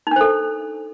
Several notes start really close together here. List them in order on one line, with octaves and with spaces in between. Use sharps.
D#4 D4 C5 A4